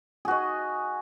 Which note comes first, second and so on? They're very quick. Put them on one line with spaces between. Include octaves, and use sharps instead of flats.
G#4 F#4 D#5